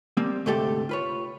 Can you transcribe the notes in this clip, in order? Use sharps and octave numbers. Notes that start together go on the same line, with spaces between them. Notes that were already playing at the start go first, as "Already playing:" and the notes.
G3 A#3 C4
D2 G#2 C3 A3 G4 A4
F4 B4 C#5